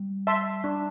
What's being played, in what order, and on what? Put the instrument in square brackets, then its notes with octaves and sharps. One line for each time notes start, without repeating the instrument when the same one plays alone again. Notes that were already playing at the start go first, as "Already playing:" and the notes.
Already playing: [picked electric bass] G3
[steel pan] E5 A5 C6
D4